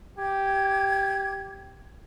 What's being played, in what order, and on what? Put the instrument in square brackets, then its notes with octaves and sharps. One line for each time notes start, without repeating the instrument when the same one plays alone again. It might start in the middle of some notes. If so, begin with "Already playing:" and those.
[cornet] G4 [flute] G#6